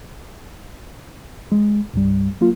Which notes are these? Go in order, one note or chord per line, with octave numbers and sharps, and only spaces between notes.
G#3
C2 G2 G3
F#3 A#3 F4